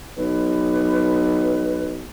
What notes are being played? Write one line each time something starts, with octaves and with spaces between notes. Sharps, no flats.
B1 B4